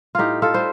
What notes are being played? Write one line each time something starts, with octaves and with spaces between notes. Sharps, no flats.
A2 D#4 F4 G4
F4 A4
G3 C5